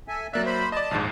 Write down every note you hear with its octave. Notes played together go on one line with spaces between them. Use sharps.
A4 E5 G#5
F2 F#3 A#3 D5 E5 F#6
C5 B5
D5 D#5 A5
A#1 D#2 G#2